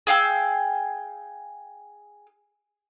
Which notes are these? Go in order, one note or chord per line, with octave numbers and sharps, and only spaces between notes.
G#4 F5 G5 E6